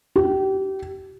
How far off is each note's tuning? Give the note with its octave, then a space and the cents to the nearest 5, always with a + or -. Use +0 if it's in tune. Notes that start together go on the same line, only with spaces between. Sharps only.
G4 -30